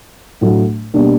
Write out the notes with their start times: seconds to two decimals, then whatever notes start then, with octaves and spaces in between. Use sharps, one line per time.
0.41 A2 F#3 A3 D4
0.94 B2 G3 A#3 D4